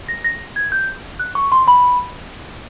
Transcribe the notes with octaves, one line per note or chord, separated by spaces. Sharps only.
A#6
A#6
G#6
G6
F#6
C#6
C6
B5